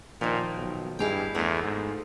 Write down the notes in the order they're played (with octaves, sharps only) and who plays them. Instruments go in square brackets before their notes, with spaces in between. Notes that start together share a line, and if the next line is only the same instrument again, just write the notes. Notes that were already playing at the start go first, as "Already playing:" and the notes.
[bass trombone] A#2 [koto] D#3 F3
[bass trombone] B1
[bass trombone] G2 [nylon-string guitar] A#3 G#4 D#5 [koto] E4 F5 G5
[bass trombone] E2 [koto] A3 F4
[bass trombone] G#2